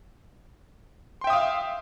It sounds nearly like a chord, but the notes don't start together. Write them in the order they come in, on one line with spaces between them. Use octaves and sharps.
C6 G5 E5 D#6 F5